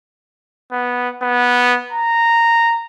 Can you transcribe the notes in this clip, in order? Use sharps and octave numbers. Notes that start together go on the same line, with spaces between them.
B3
B3
A#5